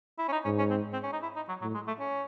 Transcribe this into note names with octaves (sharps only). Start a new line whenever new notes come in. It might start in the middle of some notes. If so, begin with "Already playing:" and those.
E4
C#4
D#4
G#2 C#4
C#4
C4
C4
C#4
D#4
E4
D#4
F#3
A2 F#3
G#3
A3
C#4